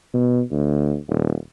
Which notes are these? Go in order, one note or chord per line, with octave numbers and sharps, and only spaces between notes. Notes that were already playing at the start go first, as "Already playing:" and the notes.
B2
D2
D#1